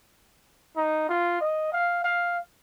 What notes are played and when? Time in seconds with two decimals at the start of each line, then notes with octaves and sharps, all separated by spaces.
0.76 D#4
1.09 F4
1.41 D#5
1.72 F5
2.04 F5